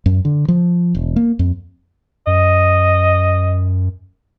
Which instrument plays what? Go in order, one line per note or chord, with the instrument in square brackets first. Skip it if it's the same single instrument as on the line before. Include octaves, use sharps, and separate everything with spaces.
[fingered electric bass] F#2
D3
F3
E1
A#3
F2
[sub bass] F#2 [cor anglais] D#5